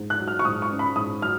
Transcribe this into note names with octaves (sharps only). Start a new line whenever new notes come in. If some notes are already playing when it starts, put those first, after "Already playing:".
Already playing: G#2
F#6
F#3
F6
C#6
G#2 D#6
C#6
C#4
B5
G#2 D#6
F#3 F6